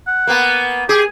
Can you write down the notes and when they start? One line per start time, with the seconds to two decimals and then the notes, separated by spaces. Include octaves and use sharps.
0.07 F#5
0.27 A#3 B3
0.89 G4 G#4